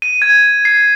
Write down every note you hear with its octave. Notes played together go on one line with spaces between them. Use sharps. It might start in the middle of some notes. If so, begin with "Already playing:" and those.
D#7
G#6
C7